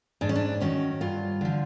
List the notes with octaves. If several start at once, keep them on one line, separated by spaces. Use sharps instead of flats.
G#2 D4
C#4
D4
D#3 F#3 C#4
G2 F4
D3 F3